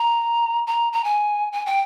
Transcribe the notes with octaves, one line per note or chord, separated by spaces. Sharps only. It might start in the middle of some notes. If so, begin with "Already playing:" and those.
Already playing: A#5
A#5
A#5
G#5
G#5
G5